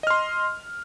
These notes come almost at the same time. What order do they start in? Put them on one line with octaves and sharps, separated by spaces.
D#5 F6 C6